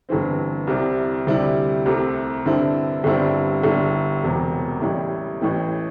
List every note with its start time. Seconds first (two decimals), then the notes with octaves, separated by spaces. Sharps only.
0.09 G1 G2 E3 C4
0.67 C2 C3 G3 E4
1.27 D2 C3 G3 E4
1.86 C2 C3 A3
2.45 G2 D3 C4 E4
3.04 G1 G2 G3 C4 E4
3.63 G1 G2 G3 E4
4.23 E1 E2 C3
4.82 A1 A2 G3 E4
5.41 A1 A2 E3